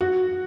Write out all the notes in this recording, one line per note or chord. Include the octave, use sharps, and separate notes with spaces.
F#4